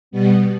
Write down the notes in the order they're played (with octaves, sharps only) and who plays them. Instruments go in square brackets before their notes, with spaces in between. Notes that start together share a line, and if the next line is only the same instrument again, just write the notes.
[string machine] B2 G3 B3